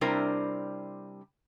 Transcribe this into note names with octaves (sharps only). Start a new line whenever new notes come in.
C3 G3 D4 E4 A#4 C5